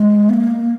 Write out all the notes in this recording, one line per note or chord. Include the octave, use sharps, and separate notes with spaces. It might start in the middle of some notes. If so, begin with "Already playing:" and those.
Already playing: G#3
B3
A#3